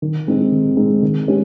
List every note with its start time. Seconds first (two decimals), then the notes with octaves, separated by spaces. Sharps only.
0.02 D#3
0.27 G#3 C4 D#4 G#4
0.52 D#3
0.77 G#3 C4 D#4 G#4
1.02 D#3
1.28 G#3 C#4 G4